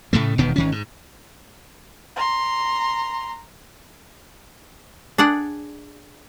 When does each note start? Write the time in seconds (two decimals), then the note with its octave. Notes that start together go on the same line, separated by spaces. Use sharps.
0.13 A2 C#3 A3
0.38 E1 B2 D#3 B3
0.56 G#1 D#3 C#4
0.72 G#2
2.16 A#5 C6
5.18 D4 G#4 D5 F#5